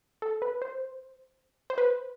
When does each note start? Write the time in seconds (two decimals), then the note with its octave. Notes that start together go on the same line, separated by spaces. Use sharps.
0.22 A4
0.42 B4
0.62 C5
1.70 C5
1.78 B4